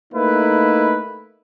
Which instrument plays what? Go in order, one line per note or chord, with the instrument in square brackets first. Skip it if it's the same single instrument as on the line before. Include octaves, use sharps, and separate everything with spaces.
[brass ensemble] A3 A#3 D#4 E4 B4